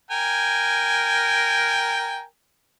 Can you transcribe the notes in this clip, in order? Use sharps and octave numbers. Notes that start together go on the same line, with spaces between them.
A#4 G5 G#5